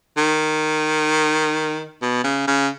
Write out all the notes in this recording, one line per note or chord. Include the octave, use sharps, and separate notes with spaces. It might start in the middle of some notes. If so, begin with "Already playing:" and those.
D#3
B2
C#3
C#3